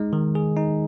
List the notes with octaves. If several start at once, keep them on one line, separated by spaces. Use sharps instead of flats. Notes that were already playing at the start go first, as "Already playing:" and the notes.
Already playing: G#3 D#4
D#3
G#4
D#4